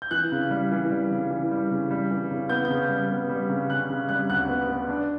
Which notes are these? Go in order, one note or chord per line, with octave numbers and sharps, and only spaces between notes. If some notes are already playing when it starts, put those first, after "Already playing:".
G6
E3 F#6
C#3
G3
E3
G3
C#3
E3
G3
C#3
G3
E3
C#3
B3 G6
G6
C#3
G3
B3
G3
C#3
C#3 F#6
C#3
G3 F#6
D2 F#6
B3
B3
D4